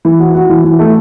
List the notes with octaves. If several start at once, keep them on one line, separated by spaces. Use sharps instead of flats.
E3
F#4
F#4
E3
E3
A3